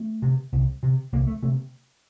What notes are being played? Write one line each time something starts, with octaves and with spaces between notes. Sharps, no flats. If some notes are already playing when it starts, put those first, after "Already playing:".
Already playing: A3
C3
C2
C3
C2 A#3
A3
C3 A3